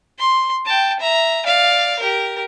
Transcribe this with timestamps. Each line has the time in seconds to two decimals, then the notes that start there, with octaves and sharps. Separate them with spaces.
0.19 C6
0.65 G5 A5
1.00 E5 A#5
1.46 D5 F5
1.99 G4 A#4